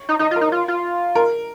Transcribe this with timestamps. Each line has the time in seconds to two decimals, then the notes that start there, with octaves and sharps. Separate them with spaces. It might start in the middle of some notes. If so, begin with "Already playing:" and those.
Already playing: C#5
0.09 D#4
0.19 D#4 D#5
0.31 F4
0.36 A#4
0.41 D#4
0.52 F4
0.68 F4
1.15 A#4